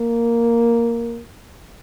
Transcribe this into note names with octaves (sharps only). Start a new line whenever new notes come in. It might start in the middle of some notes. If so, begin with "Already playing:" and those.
Already playing: A#3